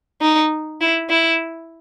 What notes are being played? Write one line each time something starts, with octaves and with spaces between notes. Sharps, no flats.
D#4
E4
E4